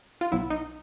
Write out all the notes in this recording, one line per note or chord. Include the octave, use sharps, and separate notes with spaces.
F4
B1 B2 F#3 E4
D#4